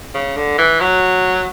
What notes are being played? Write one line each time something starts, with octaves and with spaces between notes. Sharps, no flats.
C#3
D3
E3
F#3